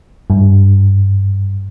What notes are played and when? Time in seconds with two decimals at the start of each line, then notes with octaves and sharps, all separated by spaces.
0.30 G2